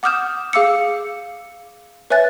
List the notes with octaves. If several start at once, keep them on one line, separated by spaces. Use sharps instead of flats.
F#5 D6 D#6 F6 G6 E7
G#4 F5 D6 E6 C#7
B4 C#5 E5 G#5 F#6 A6